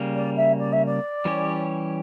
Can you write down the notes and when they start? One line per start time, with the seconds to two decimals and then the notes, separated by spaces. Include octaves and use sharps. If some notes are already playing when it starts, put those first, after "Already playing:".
Already playing: C#3 G3 A#3
0.14 D5
0.36 E5
0.58 D5
0.72 E5
0.85 D5
1.25 E3 G3 C#4 G4 C#5